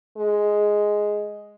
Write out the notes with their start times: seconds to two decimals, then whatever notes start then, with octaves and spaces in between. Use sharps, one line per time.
0.18 G#3